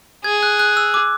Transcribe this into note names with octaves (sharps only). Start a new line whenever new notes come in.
G#4 G#6
F#6
F#6
E6
D6